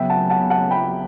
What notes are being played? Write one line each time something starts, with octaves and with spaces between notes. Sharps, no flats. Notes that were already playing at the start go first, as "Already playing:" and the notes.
Already playing: C#3 F#3 B3 E5 G5
F#5 A5
F#5 A5
F#5 A5
G5 B5